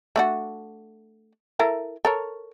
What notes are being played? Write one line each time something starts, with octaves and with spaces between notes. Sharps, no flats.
A3 D4 F#4
E4 A4 A#4
A4 A#4 C#5